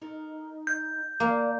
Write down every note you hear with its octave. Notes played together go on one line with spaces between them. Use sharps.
D#4 A4 A#4
F#5 G6
D#3 A#3 D5 A5